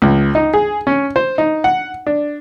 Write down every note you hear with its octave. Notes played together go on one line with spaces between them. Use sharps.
C#2
D#4
G#4
C#4
C5
D#4
F#5
D4